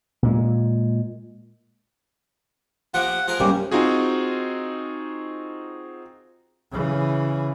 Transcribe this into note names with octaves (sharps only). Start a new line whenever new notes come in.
A#2 G#3
F3 A#3 G4 F#5
F3 G#4 A#4
C3 G3 A#3 C#4 G4
C4 D#4 F4 F#4 G#4
C#3 E3